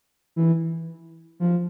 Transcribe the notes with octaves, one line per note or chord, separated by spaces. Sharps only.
E3
F3